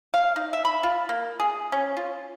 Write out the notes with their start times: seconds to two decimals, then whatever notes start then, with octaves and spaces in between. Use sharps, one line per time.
0.14 F5
0.36 D#4
0.53 E5
0.65 B5
0.83 F4
1.09 A#3
1.40 G#4
1.72 C#4
1.97 F4